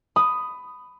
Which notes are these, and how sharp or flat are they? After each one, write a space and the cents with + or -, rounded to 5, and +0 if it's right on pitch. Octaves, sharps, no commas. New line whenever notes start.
B5 +15 D#6 +0